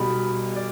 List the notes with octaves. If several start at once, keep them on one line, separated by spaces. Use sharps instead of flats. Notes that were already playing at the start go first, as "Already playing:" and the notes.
Already playing: B1 B2 G3 B5
D5